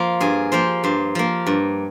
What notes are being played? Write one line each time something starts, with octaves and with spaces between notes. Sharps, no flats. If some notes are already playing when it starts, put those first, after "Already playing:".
Already playing: F3 A#3 F4 C5
G2 G#4
F3 A#3 C5
G2 C5
F3 A#3
G2